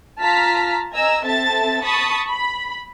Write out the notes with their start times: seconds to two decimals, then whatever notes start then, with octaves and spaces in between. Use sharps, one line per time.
0.21 F4 A5 A#5 F6 B6
0.93 D#5 G#5 A#5 E6
1.24 C4 A4 E5 A5 A6
1.82 A5 B5 C#6 D#6 A6
2.27 B5